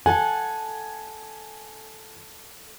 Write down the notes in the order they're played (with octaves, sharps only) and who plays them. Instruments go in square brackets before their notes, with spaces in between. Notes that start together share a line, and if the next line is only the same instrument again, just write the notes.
[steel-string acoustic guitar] A4 F#5 [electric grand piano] G#5